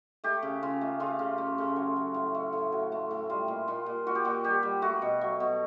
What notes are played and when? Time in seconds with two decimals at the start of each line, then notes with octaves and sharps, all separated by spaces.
0.24 A3 G4
0.43 C#3
0.63 C#3 F4
0.81 A3
1.00 C#3 F4
1.19 C#3
1.38 A3
1.58 C#3
1.76 F#3
1.96 F#3
2.14 A2
2.35 A3
2.53 A2
2.72 F#3
2.92 A3
3.11 A2
3.30 G3 F4
3.48 A#2
3.68 A#2 F4
3.86 A#2
4.07 A#2 F#4
4.15 G4
4.25 A#2 F#4
4.44 G3 G4
4.63 G3
4.82 A3 F#4
5.02 B2
5.21 F#3
5.40 B2